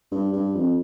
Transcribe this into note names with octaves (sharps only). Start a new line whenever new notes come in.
G2
G2
F2